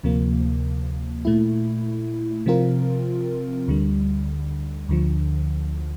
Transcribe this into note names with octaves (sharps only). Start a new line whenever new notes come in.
D2 C3 F3 A#3
A#2 A3 E4
C3 F3 C4 F4 A#4
D2 D3 G3
D2 D3 F3